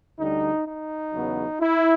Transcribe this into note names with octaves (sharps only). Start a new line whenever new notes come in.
D2 D3 G3 D#4
D#4
E2 C#3 F#3 B3
E4